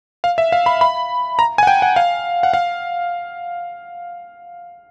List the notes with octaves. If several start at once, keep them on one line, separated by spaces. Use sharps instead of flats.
F5
E5
F5
B5
B5
A#5
G#5
F#5
G5
F#5
F5
F#5
F5